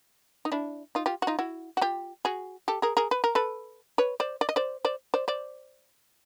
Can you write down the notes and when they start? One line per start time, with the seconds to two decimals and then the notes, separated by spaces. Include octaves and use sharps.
0.45 D#4
0.52 D4 E4
0.95 D#4 F4
1.06 F4 G4
1.22 F#4
1.27 D#4 F4
1.39 E4 F#4
1.77 F#4
1.81 F4 G4
2.25 F#4 G#4
2.68 G4 A4
2.82 G#4 A#4
2.97 G#4 A#4
3.11 B4
3.24 A#4
3.35 A4 B4
3.98 B4 C#5
4.20 C5 D5
4.41 D5
4.49 D#5
4.56 C5 D5
4.85 C5 D5
5.14 C5 D5
5.28 C5 D5